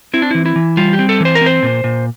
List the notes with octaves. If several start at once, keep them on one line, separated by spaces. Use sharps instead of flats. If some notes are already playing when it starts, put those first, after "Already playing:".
C4 E4
D4
E3 E4
E4
E3
G3 F4
G4
C4
A4
E3 C5
A#4
C4
C5
A#2
A#2